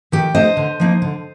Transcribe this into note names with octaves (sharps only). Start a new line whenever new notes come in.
D#3 G4
A3 D4 C5 D#5
D3
F3 A#3 D#4
D3